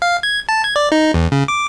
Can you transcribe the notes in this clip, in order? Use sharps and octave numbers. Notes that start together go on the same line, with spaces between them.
F5
G#6
A5
G#6
D5
D#4
E2
C#3
D6